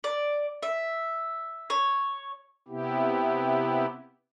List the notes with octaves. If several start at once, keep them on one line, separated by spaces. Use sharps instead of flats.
D5
E5
C#5
C3 B3 E4 G4